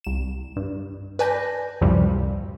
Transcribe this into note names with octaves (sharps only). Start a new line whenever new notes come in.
C2 E7
G2
B4 D5 G#5 A5 G6 A#6
C#2 F#2 A2 C3 F3 G3